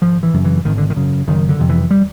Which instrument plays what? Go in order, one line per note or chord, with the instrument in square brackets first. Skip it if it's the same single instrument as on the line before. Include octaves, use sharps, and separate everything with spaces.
[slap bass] G#1 F3
E3
F#2 C#3
E3
G#1 D#3
D3
D#3
F#2 C#3
F#1 D#3
D3
F2 C3
E3
G3